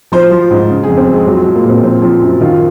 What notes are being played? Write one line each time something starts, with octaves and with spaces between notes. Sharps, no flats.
F3 C5
F3
G#2
C#3
F2 G#4
C4
F2
G#3
F3 F#3
G#3
F3
A#3
A#2 C4
F3 C4
F3 C4
F#2
D#3 F4